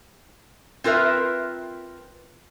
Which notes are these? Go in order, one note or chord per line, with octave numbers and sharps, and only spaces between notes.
C4 F4 A#4 B4 E5